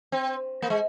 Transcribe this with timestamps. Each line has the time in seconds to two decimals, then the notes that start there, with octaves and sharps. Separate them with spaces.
0.12 C4
0.62 A#3
0.70 G#3